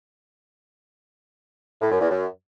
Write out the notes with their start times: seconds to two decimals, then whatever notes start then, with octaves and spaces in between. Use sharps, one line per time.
1.81 A2
1.91 F#2
2.00 E2
2.10 F#2